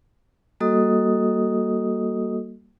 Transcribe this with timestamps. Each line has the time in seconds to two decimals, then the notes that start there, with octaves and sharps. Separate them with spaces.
0.60 G3 A#3 F#4 A4 D#5 D#6